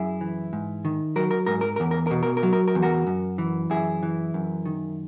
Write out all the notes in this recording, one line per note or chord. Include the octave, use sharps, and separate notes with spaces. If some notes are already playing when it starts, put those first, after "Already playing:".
Already playing: F#2 E4 G#4
E3
G#2
D#3
F#3 A#4
A#4
G#2 A#4
A#4
A#4
E2
A#4
A#4
B2
A#4
A#4
F#3
A#4
A#4
E2
F#4 A#4
F#2
E3
F#2 E4 G#4
E3
F#2
D#3